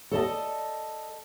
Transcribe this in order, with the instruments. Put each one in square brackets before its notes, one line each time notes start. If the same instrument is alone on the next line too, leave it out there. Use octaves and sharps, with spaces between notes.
[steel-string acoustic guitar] A4 D5 D#5 A5